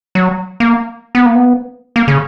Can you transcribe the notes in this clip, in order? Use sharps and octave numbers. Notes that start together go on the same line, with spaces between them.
F#3
A#3
B3
A#3
B3
A#3
C#3